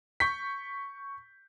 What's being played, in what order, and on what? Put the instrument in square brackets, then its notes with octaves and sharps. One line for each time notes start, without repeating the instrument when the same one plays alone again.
[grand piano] C#6 G6 B6